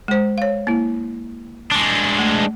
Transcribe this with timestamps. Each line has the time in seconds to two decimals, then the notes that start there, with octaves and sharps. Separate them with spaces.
0.08 G#3 C5
0.38 C#5 F5
0.67 A#3 E4
1.71 G#3 D4
2.19 A3